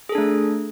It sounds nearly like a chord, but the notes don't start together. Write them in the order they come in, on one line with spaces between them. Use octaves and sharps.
G#4 A4 D4 A3